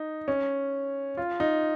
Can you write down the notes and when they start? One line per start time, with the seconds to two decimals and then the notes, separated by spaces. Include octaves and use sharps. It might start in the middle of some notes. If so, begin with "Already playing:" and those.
Already playing: D#4
0.28 C#4
1.17 F4
1.40 D#4